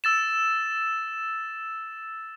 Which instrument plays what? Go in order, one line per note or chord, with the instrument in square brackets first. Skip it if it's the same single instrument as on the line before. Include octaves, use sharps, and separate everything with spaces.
[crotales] E6 A6 E7